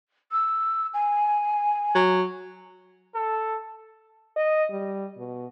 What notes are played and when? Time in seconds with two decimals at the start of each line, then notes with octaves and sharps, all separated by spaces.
0.32 E6
0.94 G#5
1.95 F#3
3.15 A4
4.36 D#5
4.71 G3
5.18 B2